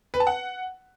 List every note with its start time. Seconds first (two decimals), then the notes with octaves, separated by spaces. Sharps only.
0.14 B4
0.20 A5
0.27 F#5